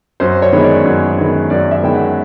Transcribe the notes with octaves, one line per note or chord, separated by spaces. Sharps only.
F#2 C5
C#5
D#3 G#3 B3
D5
F#2
D#3 G#3 B3
F#2 D5
E5
D#3 G#3 B3 G5
F#5